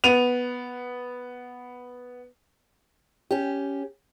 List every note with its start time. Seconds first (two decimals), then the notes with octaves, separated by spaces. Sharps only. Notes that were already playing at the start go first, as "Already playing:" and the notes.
0.04 B3 D#7 F7
3.31 C#4 G4